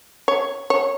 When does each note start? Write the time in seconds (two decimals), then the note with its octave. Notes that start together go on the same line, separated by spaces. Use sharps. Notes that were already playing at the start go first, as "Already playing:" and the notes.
0.28 C#5
0.70 C#5